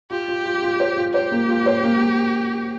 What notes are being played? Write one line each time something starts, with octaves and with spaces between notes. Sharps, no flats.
F4 G4
F4
F4
F4
C5
F4
G4 C5
A#3
F4
C5
A#3
A#3